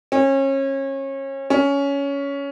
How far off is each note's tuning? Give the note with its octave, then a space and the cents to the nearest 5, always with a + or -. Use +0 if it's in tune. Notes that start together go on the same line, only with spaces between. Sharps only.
C#4 -30
C#4 +15